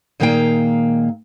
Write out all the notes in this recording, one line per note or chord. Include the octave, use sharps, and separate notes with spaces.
A#2 D#3 G#3 A#3 F5 G5